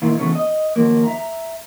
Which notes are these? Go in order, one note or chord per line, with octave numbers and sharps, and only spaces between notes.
A#2 D3 D#3 A#3 E4 F4
C#3 E3 F#3 A3 B3 C#4
D#5
D#3 F3 F#3 A#3
E5 A#5